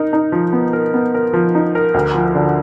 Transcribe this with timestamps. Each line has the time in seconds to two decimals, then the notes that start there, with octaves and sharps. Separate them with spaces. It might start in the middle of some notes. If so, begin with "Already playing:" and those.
Already playing: D#4 A#4
0.13 D#4
0.32 F3
0.53 B3
0.73 A#4
0.94 B3
1.14 A#4
1.33 F3
1.55 D#4
1.75 A#4
1.94 D2
2.14 F3
2.35 D3